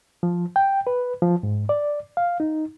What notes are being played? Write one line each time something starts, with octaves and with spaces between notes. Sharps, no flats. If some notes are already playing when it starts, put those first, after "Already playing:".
F3
G5
B4
F3
G#2
D5
F5
D#4